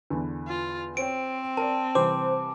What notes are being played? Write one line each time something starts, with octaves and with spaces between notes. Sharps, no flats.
E2 D3 E3
F4
C4 C5 C#5 G5 D7
A#4 D5 A5
C3 E3 G3 C5 D6